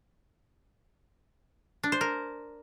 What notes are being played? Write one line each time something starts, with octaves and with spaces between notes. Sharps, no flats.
D4
C5
A#4